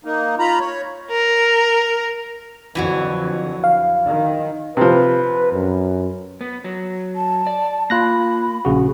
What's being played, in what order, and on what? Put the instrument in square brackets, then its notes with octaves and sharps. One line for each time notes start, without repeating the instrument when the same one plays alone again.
[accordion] A#3 D#4
F4 A#5 B5
C#5
[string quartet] A#4
[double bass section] F2 D3 [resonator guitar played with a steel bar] E3 F#3 F#4
[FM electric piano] F5
[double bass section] D#3
[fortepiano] C3 F3 [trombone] B4
[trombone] F#2
[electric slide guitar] B3
F#3
[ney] A5
[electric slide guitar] D5
[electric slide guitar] A#3 [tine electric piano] F4 F#6 A#6 [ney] B5
[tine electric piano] A#1 C#3 F#4